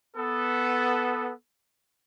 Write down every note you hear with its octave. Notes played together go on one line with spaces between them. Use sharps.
B3 A4